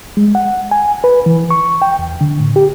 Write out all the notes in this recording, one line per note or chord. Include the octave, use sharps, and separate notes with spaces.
G#3
F#5
G#5
B4
E3
C#6
G5
E2
D3
A2
G4